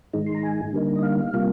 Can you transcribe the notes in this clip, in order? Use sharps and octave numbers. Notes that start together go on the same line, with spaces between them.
G#2 D#3 G#3 D#4
C6
A#5
G#5
D3 G3 A#3 D#4
D#5
F5
C3 G3 A#3 F4